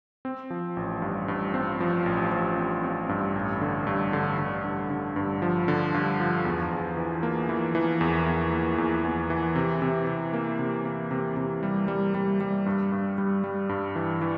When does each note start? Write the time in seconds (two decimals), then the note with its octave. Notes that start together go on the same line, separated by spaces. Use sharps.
0.25 C4
0.50 F3
0.77 A1
1.02 G2
1.28 G2
1.54 C4
1.80 F3
2.06 A1
2.32 F3
2.57 C4
2.84 C4
3.09 G2
3.35 A1
3.61 D3
3.87 G2
4.13 D3
4.39 D3
4.65 G2
4.90 D3
5.16 G2
5.42 F3
5.68 D3
5.94 G2
6.20 F3
6.45 E2
6.71 E2
6.97 E3
7.23 A#3
7.49 E3
7.75 E3
8.01 E2
8.26 E2
8.52 A#3
8.78 E2
9.05 E2
9.30 E3
9.55 C3
9.82 C3
10.07 C3
10.33 A#3
10.59 C3
10.85 A#3
11.11 C3
11.37 C3
11.63 G3
11.88 G3
12.15 G3
12.40 G3
12.66 G2
12.92 G2
13.18 G3
13.44 G3
13.69 G2
13.96 E3
14.21 E3